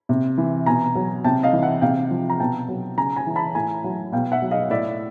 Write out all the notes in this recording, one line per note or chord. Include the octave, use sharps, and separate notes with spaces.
C3
E3
B2 G#5 A#5
F#3
C3 G5 A5
D#5 F5
E3
E5 F#5
C3 F5 G5
F3
A#5
B2 G5 A5
F#3
C#3 G#5 A#5
G#5 A#5
E3
A5 B5
A2 G#5 A#5
F#3
B2 F5 G5
E5 F#5
F#3
D#5 F5
A2 D5 E5